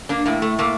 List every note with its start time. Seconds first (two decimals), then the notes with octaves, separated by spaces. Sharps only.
0.09 A#3 D4
0.26 A2 A#3
0.42 A3
0.59 A3 A#3